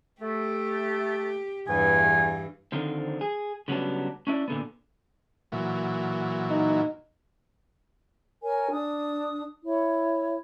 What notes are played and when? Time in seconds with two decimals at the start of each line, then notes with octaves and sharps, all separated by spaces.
0.22 A3 G4
1.68 E2 G2 E3 G#5
2.72 D3 D#3 F3 C4
3.21 G#4
3.68 C#3 F#3 G3 B3 D4
4.27 C#4 D4 E4 C#5 D5
4.48 A#2 D3 B3
5.52 A#2 E3 F#3
6.50 D#4
8.42 A#4 C#5 G#5
8.71 D4 D#6
9.64 E4 C#5